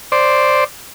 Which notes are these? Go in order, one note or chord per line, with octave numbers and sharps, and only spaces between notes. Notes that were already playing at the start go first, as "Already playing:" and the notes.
C5 D5